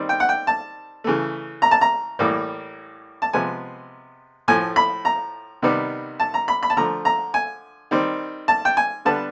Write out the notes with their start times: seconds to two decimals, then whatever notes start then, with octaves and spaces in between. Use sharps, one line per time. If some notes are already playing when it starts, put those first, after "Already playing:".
Already playing: D#3 G3 C4
0.09 G5
0.20 F#5
0.29 G5
0.47 A5
1.04 C#3 E3 A3
1.62 A#5
1.71 A5
1.81 A#5
2.19 A2 E3 G3 A#3
3.22 A5
3.33 C3 F3 G#3 B3 G#5
4.48 A2 F3 A3 G#5
4.76 B5
5.05 A#5
5.62 C3 D#3 G3 B3
6.20 A5
6.34 A#5
6.48 B5
6.63 B5
6.70 A5
6.77 D3 F3 A3 A#5
7.05 A#5
7.34 G#5
7.91 D#3 G3 C4
8.48 A5
8.65 G5
8.77 G#5
9.05 D3 G3 B3 A5